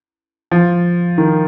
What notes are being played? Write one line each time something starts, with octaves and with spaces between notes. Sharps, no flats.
F3
D#3